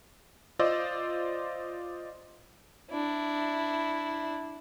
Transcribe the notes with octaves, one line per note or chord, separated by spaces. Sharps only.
F4 C5 D5 D#5 E6
D4 E4